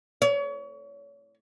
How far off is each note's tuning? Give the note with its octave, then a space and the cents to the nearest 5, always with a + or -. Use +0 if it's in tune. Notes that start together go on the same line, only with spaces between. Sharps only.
C#5 +35